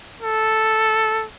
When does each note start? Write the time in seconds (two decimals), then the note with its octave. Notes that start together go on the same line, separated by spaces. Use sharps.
0.22 A4